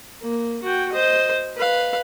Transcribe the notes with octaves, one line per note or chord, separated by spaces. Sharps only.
A#3
F#4 G5
C5 D#5
B4 F5